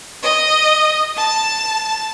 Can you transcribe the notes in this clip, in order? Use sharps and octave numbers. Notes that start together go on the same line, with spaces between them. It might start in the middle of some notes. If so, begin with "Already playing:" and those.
D#5
A5